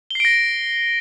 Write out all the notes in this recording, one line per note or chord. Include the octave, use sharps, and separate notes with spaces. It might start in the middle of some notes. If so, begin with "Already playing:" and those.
A#6 C7 D7 G7